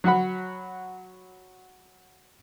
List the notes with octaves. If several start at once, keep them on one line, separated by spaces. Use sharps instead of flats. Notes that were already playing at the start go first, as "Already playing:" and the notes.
F#3 F#4 F#5 B5